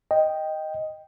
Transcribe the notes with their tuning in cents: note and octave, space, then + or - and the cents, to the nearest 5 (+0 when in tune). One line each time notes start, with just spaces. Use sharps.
D#5 +0 G5 +0